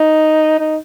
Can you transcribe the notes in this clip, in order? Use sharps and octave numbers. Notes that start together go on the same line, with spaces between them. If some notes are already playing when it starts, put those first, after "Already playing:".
Already playing: D#4
D#4